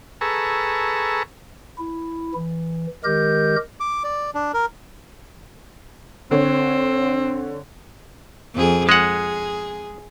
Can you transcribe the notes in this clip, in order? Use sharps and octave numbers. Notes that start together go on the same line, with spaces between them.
G#4 A4 B4 A#5 C#6 E6
E4
E3
D#3 G#3 G4 A#4 D#5 G6
D6
D5
D4
A#4
D3 C4 C#5
F2 G#4
G#3 G#4 F#5